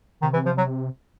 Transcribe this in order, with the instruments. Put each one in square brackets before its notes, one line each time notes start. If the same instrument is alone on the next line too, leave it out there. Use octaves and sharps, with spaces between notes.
[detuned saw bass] C3 [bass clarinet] D#3
[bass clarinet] E3
F3
F#3